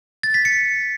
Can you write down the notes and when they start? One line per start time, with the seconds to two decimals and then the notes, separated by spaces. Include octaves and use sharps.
0.23 A6
0.34 B6
0.45 C#7